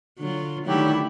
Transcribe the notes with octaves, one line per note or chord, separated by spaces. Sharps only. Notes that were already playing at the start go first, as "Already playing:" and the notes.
D3 F#3 F4
D3 D#3 F#3 G3 A3 E4 G4